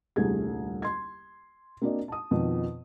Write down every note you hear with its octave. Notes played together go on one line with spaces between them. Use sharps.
D#1 C2 D3 A3 G#4 G#6
C6 G#6
A#3 C4 D4 F#4 D5 D#5
A5 D#6
F2 B2 D#3 F3